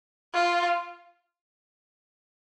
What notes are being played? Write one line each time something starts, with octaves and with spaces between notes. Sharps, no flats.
F4